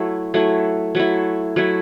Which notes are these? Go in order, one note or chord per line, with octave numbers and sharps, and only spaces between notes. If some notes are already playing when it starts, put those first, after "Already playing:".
Already playing: F#3 A3 E4
F#3 A3 E4
F#3 A3 E4
F#3 A3 E4